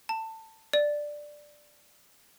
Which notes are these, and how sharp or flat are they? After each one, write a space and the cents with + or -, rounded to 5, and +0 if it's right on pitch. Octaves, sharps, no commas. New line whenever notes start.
A5 +20
D5 +5